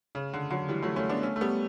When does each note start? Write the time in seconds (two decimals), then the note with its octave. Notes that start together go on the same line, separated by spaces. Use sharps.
0.15 C#3
0.33 D3
0.51 D3 F#3
0.68 E3 G3
0.82 F#3 A3
0.96 A3 C#4
1.09 B3 D4
1.23 A3 C#4
1.36 A3
1.41 G3 B3